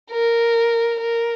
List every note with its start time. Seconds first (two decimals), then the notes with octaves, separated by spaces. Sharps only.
0.10 A#4
1.00 A#4